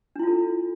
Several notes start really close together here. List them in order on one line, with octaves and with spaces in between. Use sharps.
D4 E4 F4 A4